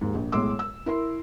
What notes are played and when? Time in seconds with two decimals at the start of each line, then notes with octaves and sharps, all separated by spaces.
0.01 D#2 G#2
0.15 A#1
0.32 B1 A2 G#3 C6 D6 E6
0.59 E6
0.86 E4 A#4 C6